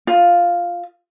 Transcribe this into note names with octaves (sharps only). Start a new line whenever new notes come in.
F4